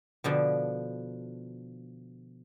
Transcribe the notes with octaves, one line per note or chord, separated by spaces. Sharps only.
B2 D3 F3